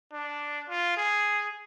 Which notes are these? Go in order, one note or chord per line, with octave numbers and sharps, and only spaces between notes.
D4
F4
G#4